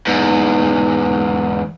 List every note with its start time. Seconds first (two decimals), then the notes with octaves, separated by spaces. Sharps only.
0.07 E2 G#2